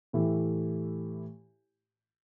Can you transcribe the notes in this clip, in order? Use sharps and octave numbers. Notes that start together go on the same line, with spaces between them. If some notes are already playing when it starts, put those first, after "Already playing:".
A2 E3 A3 E4 G4